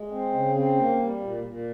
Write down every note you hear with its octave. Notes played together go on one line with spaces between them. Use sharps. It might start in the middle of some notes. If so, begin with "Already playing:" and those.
Already playing: G#3
C4
C#3
C4
A#3
G3
A#2
A#2